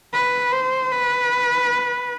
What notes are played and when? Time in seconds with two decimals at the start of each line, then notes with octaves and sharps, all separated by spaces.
0.13 B4
0.52 C5
0.92 B4